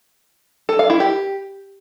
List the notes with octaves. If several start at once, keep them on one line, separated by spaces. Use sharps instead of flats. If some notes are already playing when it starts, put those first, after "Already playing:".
A4
F5
E4
G4